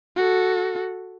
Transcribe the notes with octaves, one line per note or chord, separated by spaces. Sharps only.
F#4 A4